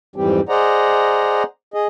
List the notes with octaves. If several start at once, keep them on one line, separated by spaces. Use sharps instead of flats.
F2 G#2 E3 G3 C4 G4
G#4 C5 D5 D#5 F#5 A#5
G#4 D#5